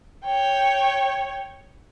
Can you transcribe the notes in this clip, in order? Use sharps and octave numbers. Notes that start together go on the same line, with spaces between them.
C#5 G5